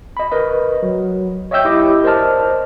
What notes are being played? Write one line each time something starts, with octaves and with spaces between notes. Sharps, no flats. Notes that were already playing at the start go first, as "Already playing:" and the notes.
D#5 B5
A#4 B4 D#5
F#3
C#5 D#5 E5 G5 E6 G6
E4 G4 D#5 D6
A#4 C5 D5 D#5 A5 F6